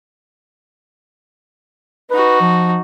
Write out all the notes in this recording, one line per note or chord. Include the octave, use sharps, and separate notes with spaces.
D#4 F#4 B4
F3